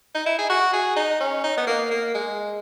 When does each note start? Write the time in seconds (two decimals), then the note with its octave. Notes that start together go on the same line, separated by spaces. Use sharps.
0.15 D#4
0.26 E4
0.38 G#4
0.50 F#4
0.73 G#4
0.96 D#4
1.20 C#4
1.44 D#4
1.57 B3
1.67 A#3
1.91 A#3
2.15 G#3